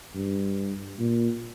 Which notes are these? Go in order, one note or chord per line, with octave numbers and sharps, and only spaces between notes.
G2
A#2